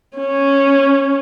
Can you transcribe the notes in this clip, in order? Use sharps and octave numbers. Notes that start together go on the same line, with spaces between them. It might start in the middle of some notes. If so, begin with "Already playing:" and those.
C#4